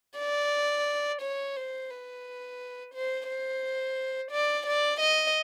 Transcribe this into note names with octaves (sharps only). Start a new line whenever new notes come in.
D5
C#5
C5
B4
C5
C5
D5
D5
D#5